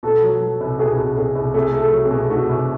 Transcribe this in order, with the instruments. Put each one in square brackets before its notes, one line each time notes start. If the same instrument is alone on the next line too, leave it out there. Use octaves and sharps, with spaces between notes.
[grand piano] B2 [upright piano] A4
[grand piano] F#3
F#3
C2
[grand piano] B2 [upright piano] G#4
[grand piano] B2
[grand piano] B2 [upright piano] G#4
[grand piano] C2
[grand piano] A3 [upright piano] G#4
[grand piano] A3
[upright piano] A4
[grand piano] F#3
[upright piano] G#4
[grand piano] B2
[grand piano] A3 [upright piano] F#4
[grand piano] C2